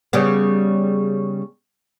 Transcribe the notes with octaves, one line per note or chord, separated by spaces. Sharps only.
C#3 G3 B3